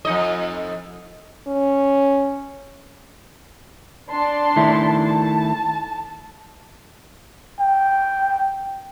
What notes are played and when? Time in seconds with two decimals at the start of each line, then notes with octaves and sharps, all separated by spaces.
0.05 F2 D#4 D#5
1.47 C#4
4.11 D4 A5 C6
4.56 D#3 A3 E4
5.05 A5
7.60 G5